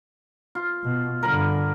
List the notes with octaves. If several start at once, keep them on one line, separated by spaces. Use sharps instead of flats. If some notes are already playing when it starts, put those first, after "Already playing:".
F4
B2
G2 D3 A#4 B5